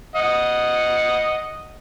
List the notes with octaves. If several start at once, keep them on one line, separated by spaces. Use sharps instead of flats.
D#5 F#5